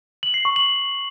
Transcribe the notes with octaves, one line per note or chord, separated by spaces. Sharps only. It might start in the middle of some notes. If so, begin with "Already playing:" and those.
F#7
C7
C#6
F#7